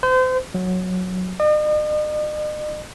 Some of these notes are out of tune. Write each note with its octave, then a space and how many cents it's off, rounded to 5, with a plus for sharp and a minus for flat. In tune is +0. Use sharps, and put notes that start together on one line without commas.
C5 -35
F#3 -10
D#5 -45